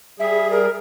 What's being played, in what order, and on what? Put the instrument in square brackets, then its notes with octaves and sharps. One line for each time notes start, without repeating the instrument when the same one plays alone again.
[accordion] G3 G#4 [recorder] E5
[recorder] A#4